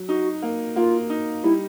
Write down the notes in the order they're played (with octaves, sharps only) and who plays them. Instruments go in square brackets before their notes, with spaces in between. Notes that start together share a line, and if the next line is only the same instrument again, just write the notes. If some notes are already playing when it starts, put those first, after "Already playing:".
Already playing: [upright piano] F#3
[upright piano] D#4 [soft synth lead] F#4
[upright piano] A#3
[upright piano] A#3 [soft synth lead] F4
[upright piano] D#4
[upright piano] G3 [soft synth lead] E4